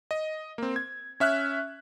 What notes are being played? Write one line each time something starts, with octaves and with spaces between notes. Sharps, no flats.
D#5
A#3 C4
G#6
C#4 E5 F6 F#6